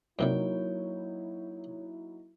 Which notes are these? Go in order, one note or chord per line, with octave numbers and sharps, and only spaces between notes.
G2 C3 F#3 G3 A#3 D#4 E4 C#5